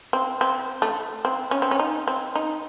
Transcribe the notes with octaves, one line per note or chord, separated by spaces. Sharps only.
C4
C4
A3
C4
C#4
C4
C#4
D#4
C4
D#4